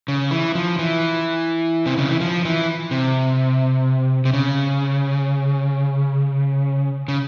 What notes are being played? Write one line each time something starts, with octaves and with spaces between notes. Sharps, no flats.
C#3
E3
F3
E3
C3
C#3
E3
F3
E3
C3
C3
C#3
C#3